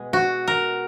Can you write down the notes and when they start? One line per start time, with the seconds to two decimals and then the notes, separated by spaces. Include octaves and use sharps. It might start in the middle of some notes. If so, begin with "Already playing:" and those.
Already playing: B2 G#3
0.13 F#4
0.48 A#4